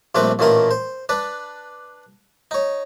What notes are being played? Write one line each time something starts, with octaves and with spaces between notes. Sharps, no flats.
A#1 G3 A3 C4 B4 D6
A1 A#2 D#3 A3 A#4 A#5
C5
D4 B4 D5
D#4 C#5